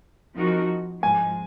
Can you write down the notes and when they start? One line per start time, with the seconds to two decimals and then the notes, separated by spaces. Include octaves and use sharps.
0.34 F3 C4 D#4 F#4 A#4
1.02 G#2 F3 G#3 G#5